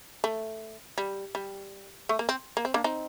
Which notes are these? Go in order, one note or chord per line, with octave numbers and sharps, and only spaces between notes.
A3
G3
G3
A3
A#3
C4
A#3
C4
A#3 D4
C4 D#4